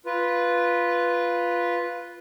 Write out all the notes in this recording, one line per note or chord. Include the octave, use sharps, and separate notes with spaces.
F4 B4